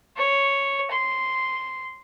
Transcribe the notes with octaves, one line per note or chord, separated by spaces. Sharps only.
C#5
C6